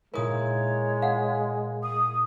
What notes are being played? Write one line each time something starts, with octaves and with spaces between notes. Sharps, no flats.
A#2 G#3 E4 A#4 C#5 D#6
F5 F#5
D#6